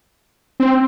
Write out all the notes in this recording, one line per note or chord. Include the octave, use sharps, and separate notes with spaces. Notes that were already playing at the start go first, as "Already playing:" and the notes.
C4